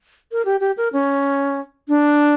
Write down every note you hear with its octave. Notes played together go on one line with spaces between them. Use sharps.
A#4
G4
G4
A#4
C#4
D4